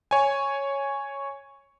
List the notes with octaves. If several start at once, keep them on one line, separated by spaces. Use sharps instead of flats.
C#5 G#5